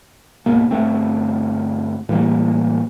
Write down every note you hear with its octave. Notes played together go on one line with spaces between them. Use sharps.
D1 G#1 B2 A#3
G1 G2 A3 C4
A2 E3 G3 A#3